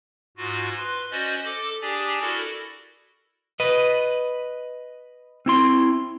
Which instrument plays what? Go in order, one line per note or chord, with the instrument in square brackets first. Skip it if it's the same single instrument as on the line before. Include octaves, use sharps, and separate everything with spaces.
[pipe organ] G#2 F4 F#4
B4 C6
C#4 F#4 C5 D5 D#5
A4 D6
D4 G4 G#4 D5 G#5
E4 F#4 A4 A#4 D5
[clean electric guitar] B4 D#5
C4 E4 C6